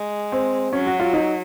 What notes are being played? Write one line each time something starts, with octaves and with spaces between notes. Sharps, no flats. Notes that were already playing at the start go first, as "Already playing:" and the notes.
Already playing: G#3
C4
F#3 C#4
F#4
F4
D#4